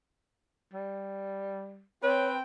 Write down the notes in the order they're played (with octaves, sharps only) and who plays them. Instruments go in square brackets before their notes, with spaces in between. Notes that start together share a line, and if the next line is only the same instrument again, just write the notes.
[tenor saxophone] G3
[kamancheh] C4 G5 [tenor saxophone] B4 [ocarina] C#5